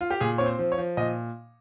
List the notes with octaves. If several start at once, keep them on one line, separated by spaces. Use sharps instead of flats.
F4
G4
A#2 G#4
C4 C#5
C5
F3
C#5
F3
A#2 D#5